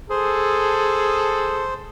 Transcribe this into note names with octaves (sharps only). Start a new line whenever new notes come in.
G#4 A4 C5